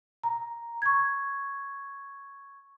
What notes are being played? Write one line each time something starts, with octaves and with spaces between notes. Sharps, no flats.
A#5
C#6 G#6